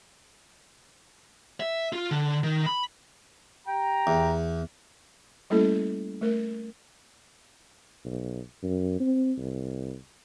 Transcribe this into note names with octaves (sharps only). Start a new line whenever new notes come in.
E5
F4
D3
D#3
B5
G4 G5 A#5
E2
G3 A3 A#3 C#4 E4 A4
A3 A#4
B1
F#2
C4
C2